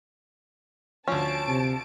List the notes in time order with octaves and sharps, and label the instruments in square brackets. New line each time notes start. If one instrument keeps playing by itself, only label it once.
[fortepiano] D2 F3 [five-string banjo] C#4 [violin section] A5 D7
[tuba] C3